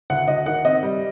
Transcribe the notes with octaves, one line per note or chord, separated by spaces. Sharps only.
D2 F#5
D2 D#5
D#3 F#5
C4 D#5
G3